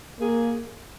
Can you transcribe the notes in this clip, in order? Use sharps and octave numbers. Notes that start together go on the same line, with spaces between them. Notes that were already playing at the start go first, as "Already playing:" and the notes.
A#3 G#4